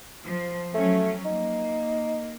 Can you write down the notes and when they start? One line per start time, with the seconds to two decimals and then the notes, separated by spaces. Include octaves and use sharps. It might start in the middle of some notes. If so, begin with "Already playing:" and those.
0.24 F3
0.74 F#3 A3 C#4
1.25 A#3 D#4